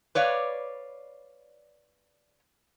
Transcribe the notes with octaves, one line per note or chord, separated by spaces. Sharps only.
B4 C#5 D5 F5